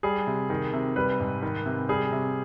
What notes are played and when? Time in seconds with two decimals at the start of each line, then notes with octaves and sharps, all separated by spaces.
0.03 G3 G#4
0.27 C3
0.50 D#3
0.73 C3
0.96 G3 B4
1.20 G#2
1.42 D#3
1.66 C3
1.89 G3 G#4
2.12 C3